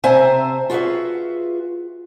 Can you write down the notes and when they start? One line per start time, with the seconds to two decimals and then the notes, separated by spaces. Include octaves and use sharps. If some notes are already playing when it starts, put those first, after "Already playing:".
0.04 C3 C4 C5 E5 G#5 A5
0.70 F4 F#4 G#4 B4 E5